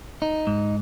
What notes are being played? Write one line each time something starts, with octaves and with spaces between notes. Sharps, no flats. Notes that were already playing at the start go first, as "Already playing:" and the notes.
D#4
G#2